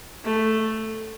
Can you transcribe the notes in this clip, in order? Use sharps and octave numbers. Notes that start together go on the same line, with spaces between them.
A3